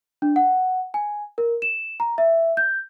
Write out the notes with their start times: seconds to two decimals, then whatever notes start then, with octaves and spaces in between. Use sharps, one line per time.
0.22 D4
0.36 F#5
0.94 G#5
1.38 A#4
1.62 E7
2.00 A#5
2.18 E5
2.57 G6